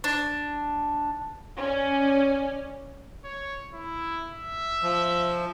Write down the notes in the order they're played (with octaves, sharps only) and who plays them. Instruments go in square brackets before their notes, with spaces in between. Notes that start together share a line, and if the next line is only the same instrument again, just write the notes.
[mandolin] D4
[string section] C#4 D5
[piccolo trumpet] C#5
E4
E5
[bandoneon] F3